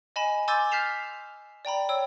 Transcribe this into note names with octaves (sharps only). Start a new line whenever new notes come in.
D#5 G#5 B5 E7
G#5 C6 D6 E6 G6 A6
F6 G6 B6 C7 E7 F7
D5 G5 A#5 B5
C#5 G5 E6